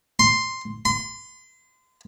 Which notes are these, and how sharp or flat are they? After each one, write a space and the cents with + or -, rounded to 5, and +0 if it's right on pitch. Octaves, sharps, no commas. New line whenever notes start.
C6 +0
C6 -35